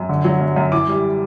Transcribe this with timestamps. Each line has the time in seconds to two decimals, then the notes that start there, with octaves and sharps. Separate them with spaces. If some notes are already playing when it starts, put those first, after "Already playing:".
Already playing: F#2
0.09 D3
0.25 F#3
0.41 F#2
0.56 F#2
0.72 E3 D6
0.88 G3